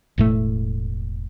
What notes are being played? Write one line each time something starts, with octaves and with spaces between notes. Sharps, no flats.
E1 A2 A3